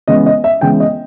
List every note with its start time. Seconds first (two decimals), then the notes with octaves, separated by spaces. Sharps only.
0.08 C#3 E3 G#3 B3 D#5
0.26 D#5
0.44 E5
0.61 C#3 E3 G#3 B3 G5
0.80 D#5